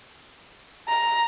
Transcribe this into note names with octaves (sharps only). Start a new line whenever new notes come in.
A#5